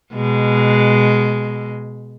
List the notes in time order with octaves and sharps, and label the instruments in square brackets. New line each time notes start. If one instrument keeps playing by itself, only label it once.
[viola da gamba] B2 G#3